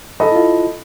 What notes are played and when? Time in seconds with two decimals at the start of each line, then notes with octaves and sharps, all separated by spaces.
0.20 A4 D#5 B5
0.32 E4 F4